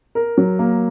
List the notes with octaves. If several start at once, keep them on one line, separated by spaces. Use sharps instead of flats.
A#4
F#3
A#3